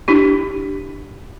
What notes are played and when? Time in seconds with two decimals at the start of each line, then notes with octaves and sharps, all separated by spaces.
0.08 D4 E4 G4